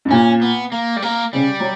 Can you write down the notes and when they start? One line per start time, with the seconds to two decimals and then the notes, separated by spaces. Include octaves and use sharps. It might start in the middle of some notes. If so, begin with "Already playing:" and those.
0.05 G2
0.10 A#2 C#4
0.42 B3
0.72 A#3
0.96 G3
1.02 A#3
1.33 C#3 G3
1.60 F#3